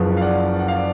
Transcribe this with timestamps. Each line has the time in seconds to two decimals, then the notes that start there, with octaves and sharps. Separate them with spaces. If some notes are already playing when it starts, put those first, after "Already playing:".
Already playing: F#1 F#2 F3 G#4 B4
0.17 F5
0.21 D5 F#5
0.60 F#5
0.68 F5
0.76 D5